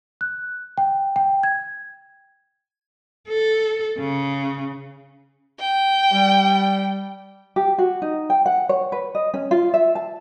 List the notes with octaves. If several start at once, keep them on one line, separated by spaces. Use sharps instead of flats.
F#6
G5
G5
G#6
A4
C#3
G5
G3
G4
F#4
D#4
G5
F#5
C#5
B4
D#5
C#4
F4
E5
A5